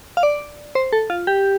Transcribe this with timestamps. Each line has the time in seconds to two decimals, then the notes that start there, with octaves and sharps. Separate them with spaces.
0.17 F5
0.23 D5
0.75 C5
0.93 A4
1.10 F4
1.27 G4